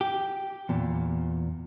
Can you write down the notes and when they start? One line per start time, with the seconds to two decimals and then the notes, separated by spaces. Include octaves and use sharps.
0.01 G4
0.69 E2 A#2